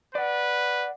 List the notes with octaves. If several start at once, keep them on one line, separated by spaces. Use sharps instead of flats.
B4 D5 F#5